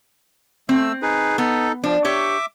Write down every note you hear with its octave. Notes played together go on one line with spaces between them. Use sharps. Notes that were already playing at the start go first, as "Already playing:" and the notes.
A3 C4 E6
D#4 G#4 B4
B3 D#4 A4
F3 D4
G4 C#5 E5 D6